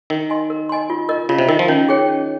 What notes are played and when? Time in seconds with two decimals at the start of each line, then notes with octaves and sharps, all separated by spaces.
0.10 D#3 A#4
0.30 D#5 G#5 C6
0.50 A#4
0.69 D#5 G#5 C6
0.90 F4
1.09 A#4 D#5
1.29 C#3 F4
1.38 C3
1.48 D#3 A#4 D#5
1.59 F3
1.68 D#3 C#4
1.89 G#4 C#5 G5
2.08 C#4